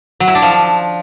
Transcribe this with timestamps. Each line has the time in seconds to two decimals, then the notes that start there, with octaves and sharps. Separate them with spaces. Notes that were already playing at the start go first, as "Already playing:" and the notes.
0.20 F#3
0.28 E4
0.35 D4
0.42 F3